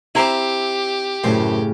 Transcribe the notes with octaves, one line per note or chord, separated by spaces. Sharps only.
C4 E4 G4 C5 E5 A#5
F#2 A2 C#3 C5